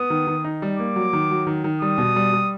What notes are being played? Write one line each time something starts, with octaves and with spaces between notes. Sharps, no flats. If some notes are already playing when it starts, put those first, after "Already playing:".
Already playing: B3 D#6
D#3
D#3
D#4
G3
A#3 D6
F#3
D#3
F#3
D#3
D#3
G3 D#6
B2
G3
G3